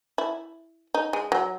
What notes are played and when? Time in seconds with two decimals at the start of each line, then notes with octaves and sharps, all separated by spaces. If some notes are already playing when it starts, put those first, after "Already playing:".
0.18 E4
0.94 D#4
1.13 G#3
1.32 F#3